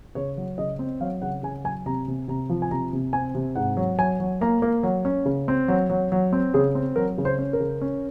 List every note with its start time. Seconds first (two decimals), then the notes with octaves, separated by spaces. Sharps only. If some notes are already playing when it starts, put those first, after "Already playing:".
0.15 C#3 C#5
0.37 F#3
0.58 C#3 D#5
0.79 C4
1.01 F#3 F5
1.22 C#3 F#5
1.43 C#3 G#5
1.64 F#3 G#5
1.86 C3 A#5
2.08 C3
2.28 C3 A#5
2.49 F3
2.62 G#5
2.70 C3 A#5
2.93 C3
3.13 C4 G#5
3.35 C3
3.55 G#2 F#5
3.77 F#3
3.98 F#3 G#5
4.20 F#3
4.41 A#3 A#5
4.62 A#3
4.83 F#3
5.05 C#4
5.26 C#3
5.48 C4
5.68 F#3
5.90 F#3
6.12 F#3
6.33 C4
6.54 C#3 G#4
6.75 C4
6.96 F#3 A#4
7.18 C#3
7.25 C5
7.39 C#4
7.53 A#4
7.60 C#3
7.81 C#4